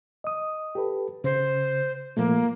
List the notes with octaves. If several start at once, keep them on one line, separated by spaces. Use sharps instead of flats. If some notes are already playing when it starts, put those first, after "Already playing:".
D#5 D#6
G4 A4 B4
C#3 C5
A#2 F3 A3 A#3